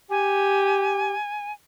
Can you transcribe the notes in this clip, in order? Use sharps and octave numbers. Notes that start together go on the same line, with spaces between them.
G4 G#5